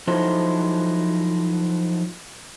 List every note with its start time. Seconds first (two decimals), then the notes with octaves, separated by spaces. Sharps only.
0.07 F3 F#3 D#4 E4 A4 C5